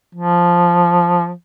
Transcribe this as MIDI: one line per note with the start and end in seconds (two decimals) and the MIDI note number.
0.15 1.32 53